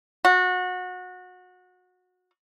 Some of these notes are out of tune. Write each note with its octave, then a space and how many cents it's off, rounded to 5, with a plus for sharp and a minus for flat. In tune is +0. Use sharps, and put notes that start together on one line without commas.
F#4 -25